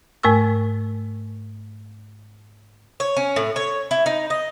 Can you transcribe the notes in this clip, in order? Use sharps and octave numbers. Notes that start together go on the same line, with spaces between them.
G#2 A3 A#4 C#6 E6
C#5
C#4
A2
C#5
E4
D#4
D#5